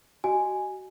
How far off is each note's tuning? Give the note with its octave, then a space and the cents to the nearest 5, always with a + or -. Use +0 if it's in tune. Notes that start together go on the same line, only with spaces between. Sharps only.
F#4 +25 D#5 -15 G#5 +0